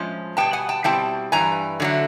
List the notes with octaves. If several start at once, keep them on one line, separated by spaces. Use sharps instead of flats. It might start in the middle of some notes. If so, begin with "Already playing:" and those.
Already playing: A2 F3 G#3 C#4
B2 G3 B3 G5 A5
F#5 G#5
G5 A5
B2 G3 C4 E4 G5 A5
G2 E3 G3 G#5 A#5
D3 F#3 A3